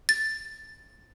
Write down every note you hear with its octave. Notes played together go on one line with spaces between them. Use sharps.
A6